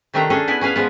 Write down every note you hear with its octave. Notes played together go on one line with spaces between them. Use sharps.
C3 D#3 A3 D4 E5 A#5
C#4 D4 G#4 A4
B3 E4 B4 G#5
C#4 G#4 B4 F5
F3 G#3 B3